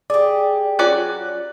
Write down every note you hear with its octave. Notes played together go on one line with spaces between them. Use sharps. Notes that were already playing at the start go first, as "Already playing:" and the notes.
G4 G#4 D5
F#3 C#4 F4 D5 F#6